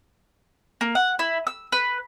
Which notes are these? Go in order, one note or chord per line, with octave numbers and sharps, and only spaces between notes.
A#3
F#5
E4
E6
B4